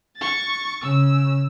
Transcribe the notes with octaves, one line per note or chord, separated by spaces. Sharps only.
C#6 A6
C#3 E6